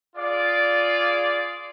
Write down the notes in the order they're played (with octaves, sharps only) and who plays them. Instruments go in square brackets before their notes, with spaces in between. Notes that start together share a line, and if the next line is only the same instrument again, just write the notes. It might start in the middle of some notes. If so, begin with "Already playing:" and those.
[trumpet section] F4 G#4 D5 F5